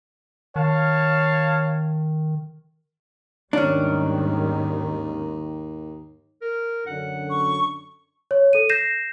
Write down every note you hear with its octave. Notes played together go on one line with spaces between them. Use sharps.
D#3 C#5 F5 A5
D#2 G#2 D#3 G3 C#4 D4
A#4
F#2 D3 F#5
C#6
C#5
A4 D#7
G6 A#6 C7 E7